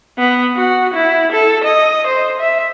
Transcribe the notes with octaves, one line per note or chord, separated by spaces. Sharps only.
B3
F#4
E4
A4
D#5
C5
E5